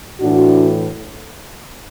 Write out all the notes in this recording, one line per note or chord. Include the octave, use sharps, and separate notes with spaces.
A2 E3 D4 F#4